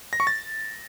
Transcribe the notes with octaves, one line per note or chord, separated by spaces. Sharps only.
A#6
C#6
A6